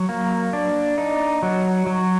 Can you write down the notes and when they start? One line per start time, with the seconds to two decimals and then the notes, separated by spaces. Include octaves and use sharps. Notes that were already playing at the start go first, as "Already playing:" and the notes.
Already playing: F#3
0.09 A#3
0.53 D4
0.98 D#4
1.43 F#3
1.87 F#3